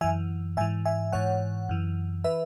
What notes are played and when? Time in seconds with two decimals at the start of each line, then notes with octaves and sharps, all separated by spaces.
0.01 F#2 E3 E5 G#5
0.57 G#2 E3 E5 G#5
0.85 E5 G#5
1.12 G#2 E3 C#5 F#5
1.69 F#2 E3
2.24 E3 B4 E5